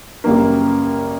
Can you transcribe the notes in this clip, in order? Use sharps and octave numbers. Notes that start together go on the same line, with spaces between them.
F#2 C#3 G3 A#3